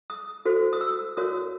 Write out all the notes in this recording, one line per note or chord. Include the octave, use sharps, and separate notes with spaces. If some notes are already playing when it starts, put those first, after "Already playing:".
D#6
F#4 A4 C5
D#6
E6
F#4 A#4 C#5 D#6